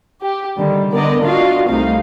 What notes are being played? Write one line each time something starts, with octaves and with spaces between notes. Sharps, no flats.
G4
D3 D#3 G3
D3 B3 A#4 D5 D#5
D4 F4 F#4 D#5 F5
C2 C3 A3 D#4 F5